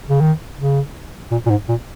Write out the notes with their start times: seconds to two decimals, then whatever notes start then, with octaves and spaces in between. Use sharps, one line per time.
0.09 C#3
0.21 D#3
0.58 C#3
1.31 A#2
1.46 A#2
1.50 G#2
1.69 A#2